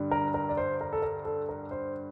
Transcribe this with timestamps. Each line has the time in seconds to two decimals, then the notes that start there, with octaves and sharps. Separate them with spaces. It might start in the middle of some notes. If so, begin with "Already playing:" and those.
Already playing: G2 D3 G3
0.11 A#4
0.34 A#4
0.49 D5
0.57 C5
0.81 A#4
0.93 A4
1.02 A#4
1.25 A4
1.49 A#4
1.71 C5